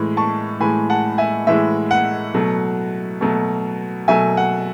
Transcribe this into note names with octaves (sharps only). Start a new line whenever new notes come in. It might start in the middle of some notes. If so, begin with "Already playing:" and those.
Already playing: A2 E3 G#3
A5 C#6
A2 E3 G#3 G#5 B5
F#5 A5
E5 G#5
A2 E3 G#3 E5
F#5
B2 F#3 A3
B2 F#3 A3
B2 F#3 A3 E5 G#5
F#5